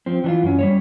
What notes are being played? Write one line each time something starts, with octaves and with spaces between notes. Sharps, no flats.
F3 C4
E3 D4 F4
F#2 C#4
G3 G#3 C#5